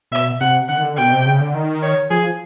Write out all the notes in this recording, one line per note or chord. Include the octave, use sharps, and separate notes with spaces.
B2 E5
C3 F#5
D3 F#5
D#3
D3
B2 G5
C3
C#3
D3
D#3
C#5
F3 G#4